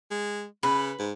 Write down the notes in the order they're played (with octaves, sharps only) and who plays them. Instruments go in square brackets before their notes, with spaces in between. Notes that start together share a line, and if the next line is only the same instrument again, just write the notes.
[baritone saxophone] G#3
[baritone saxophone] C#3 [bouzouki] B4
[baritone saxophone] G#2